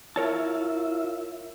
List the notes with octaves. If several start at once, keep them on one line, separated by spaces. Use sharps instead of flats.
E4 F4 A#4 C#5 E5 A5